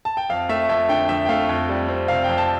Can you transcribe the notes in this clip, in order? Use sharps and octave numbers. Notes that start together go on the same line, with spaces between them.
A5
G5
F2 F5
A3 E5
F2 E5
D3 G5
F2 E5
G5
A3 F5
F2
G3
C4
C3 F5
F2 G5
A5